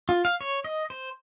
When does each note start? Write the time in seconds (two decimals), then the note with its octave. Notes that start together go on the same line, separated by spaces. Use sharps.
0.09 F4
0.25 F5
0.41 C#5
0.64 D#5
0.90 C5